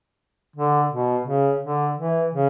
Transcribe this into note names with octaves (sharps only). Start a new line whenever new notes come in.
D3
B2
C#3
D3
E3
C#3